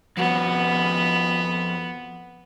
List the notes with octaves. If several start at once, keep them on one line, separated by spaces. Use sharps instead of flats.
F2 B3 F#4